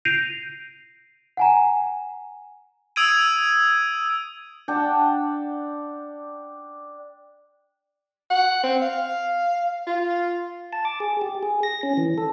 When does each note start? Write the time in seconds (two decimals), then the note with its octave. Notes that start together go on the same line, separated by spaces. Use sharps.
0.05 G6 A#6 C7 D7 D#7 F7
1.37 F#5 G#5 A#5
2.96 D#6 E6 G#6 D7 D#7
4.68 D4 F#5 G5 A5
8.30 F#5
8.63 C4
8.82 F5
9.87 F4
10.73 A5
10.85 D6
11.00 G#4
11.21 G4
11.43 G#4
11.63 A#6
11.83 C#4
11.97 E3
12.18 A4